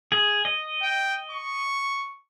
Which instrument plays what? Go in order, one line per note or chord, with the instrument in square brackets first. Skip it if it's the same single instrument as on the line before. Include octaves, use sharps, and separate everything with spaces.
[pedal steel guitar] G#4
D#5
[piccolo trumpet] G5
C#6